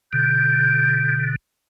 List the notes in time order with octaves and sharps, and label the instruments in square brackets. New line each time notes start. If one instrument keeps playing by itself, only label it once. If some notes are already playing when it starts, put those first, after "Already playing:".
[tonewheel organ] B2 D3 [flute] G6